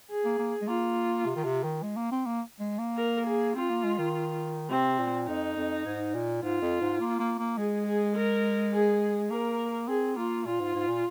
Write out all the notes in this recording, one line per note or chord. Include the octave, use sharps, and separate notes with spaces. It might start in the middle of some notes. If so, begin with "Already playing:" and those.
G#4
A#3
A#3
G#3
A#3 F4
C3
D#3
C3
D#3
G#3
A#3
C4
A#3
G#3
A#3
A#4
G#4
C4 F4
A#3
G#3
D#3
C3 C4
A#2
F2 D#4
F2
G#2
A#2
G#2 F4
F2
G#2
A#3
A#3
A#3
G#3 G#4
G#4
A#4
G#4
A#3 A#4
C4 G#4
A#3 F4
A#2 F4
G#2
G#2
A#2